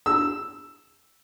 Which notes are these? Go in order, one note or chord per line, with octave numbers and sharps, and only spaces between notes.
E6